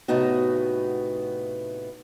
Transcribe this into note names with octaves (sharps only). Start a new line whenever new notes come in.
A2 C3 A3 B3 D#4 F#4